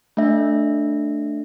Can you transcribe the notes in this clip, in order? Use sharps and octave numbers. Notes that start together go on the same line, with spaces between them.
A3 D4 E5